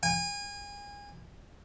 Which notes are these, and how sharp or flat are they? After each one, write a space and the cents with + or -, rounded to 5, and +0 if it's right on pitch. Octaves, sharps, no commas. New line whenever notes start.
G#5 -30